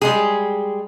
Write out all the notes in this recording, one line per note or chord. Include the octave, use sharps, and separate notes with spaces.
G3 G#3 G#4